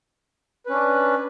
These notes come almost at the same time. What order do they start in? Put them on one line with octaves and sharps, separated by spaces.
B4 C#4 D4